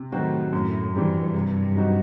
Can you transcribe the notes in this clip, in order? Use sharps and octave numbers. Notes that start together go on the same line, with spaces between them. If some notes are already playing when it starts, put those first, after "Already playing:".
Already playing: C3
A2 D#3 F#3 C4 F#4
F#2 A2
G2 E3 G3 C4
C3
F#3 C4 D#4 F#4